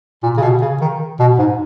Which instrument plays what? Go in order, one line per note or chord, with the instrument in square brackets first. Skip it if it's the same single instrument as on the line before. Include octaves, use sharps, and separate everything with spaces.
[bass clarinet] A#2
C#3
B2
C#3
D#3
B2
G#2